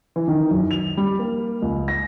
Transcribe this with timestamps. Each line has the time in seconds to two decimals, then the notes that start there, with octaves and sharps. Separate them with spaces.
0.16 E3
0.28 D#3
0.51 F#2
0.71 F7
0.97 G3
1.19 A#3
1.62 C#2
1.88 A#6